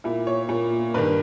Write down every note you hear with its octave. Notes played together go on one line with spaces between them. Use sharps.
A#2 E4
C#5
A#2
G2 D#3 B4